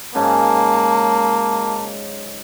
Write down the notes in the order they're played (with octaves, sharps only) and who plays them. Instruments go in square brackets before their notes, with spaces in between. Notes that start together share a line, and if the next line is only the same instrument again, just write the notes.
[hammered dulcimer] G#2 C#3 F#3 [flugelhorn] A#3 [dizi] A5